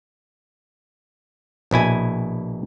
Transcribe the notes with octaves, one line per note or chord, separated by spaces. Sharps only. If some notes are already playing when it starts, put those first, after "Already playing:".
A#1 B2 E4 G#5